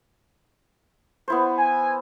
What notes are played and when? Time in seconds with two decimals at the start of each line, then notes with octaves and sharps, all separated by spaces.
1.28 B3 E4 C5
1.58 G#5